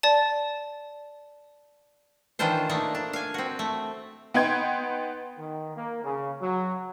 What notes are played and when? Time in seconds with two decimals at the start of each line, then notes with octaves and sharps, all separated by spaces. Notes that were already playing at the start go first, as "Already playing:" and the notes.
0.03 D5 A5
2.39 D#3 E3 D4 F4 C5
2.69 A3 A#3 D4 D#4
2.95 D4
3.13 F5 G#5
3.34 C4 F#4
3.59 A3
4.34 B3 D#4 G5 C6 G#6
5.38 D#3
5.76 A#3
6.04 C#3
6.41 F#3